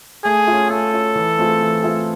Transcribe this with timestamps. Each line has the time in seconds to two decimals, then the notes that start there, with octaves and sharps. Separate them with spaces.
0.25 A3 G#4
0.47 C#4 F4
0.70 A3 A4
0.93 C#4 F4
1.15 E3
1.38 A3 C4 F4 G#4
1.61 E3
1.83 A3 C4 F4 G#4